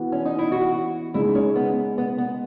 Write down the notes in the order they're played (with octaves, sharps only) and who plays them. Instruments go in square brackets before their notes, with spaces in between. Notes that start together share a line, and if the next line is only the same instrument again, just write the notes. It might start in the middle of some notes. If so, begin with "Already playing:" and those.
Already playing: [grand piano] E3 B3 F#4
[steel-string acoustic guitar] C#4
D#4
E4
F#4
[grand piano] C#3 G#3 D#4 G#4 [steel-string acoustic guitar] E4
[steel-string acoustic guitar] C#4
B3
B3
B3